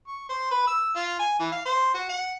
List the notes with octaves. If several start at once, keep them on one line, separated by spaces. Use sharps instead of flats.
C#6
C5
B4
E6
F4
G#5
E3
F5
C5
F#4
F#5